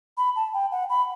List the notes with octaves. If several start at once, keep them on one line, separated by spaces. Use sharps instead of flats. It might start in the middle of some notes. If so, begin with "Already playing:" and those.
B5
A5
G5
F#5
B5